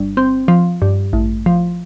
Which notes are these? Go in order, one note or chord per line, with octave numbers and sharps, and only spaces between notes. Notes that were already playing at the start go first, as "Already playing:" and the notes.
Already playing: G1
C4
F3
G2
A1
F3